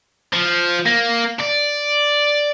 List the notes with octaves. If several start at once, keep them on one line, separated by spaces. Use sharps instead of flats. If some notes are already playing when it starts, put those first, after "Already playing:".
F3
A#3
D5